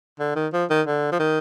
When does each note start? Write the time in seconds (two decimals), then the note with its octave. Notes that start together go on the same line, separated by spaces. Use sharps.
0.20 D3
0.36 D#3
0.53 F3
0.70 D#3
0.87 D3
1.12 F3
1.19 D#3